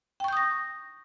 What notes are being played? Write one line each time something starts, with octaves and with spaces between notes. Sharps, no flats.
G5 C#6 D#6 G6 A#6